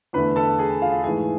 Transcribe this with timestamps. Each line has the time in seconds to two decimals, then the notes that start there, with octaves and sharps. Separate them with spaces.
0.13 E2 D3 A3 B4 B5
0.36 A4 A5
0.59 G#4 G#5
0.82 F4 F5
1.04 G#2 E3 A3 G#4 G#5